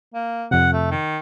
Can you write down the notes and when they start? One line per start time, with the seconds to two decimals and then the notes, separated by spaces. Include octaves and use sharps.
0.14 A#3
0.51 F2 C3 F#5
0.73 A3
0.91 D#3